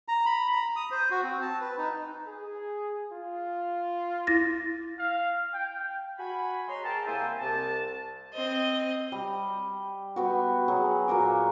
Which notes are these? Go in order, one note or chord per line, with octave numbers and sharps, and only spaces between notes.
A#5
B5
A#5
D#6
C5
F#4
C4
A5
B4
D#4
G#4
F4
E4 A6 A#6
F5
G5
F#4 G#5 B5
G#3 C#5 A#5 C6
G#4 A#4 G5 A5
C2 A#3 E4 C5 E5 G#5
C2 A5
C4 D#5
G3
G3 B3 F#4
F#3 G#4
A#2 A#3 F#4 D6